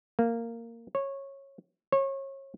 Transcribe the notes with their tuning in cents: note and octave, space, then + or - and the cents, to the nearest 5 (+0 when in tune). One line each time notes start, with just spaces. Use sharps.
A#3 -15
C#5 -15
C#5 -30